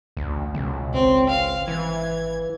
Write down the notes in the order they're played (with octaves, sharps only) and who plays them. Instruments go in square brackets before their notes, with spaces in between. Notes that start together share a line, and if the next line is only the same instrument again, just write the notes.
[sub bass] A1 [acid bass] D2
[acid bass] C#2 [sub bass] B2
[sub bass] G#1 [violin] C4
[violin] F5
[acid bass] E3 [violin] G#6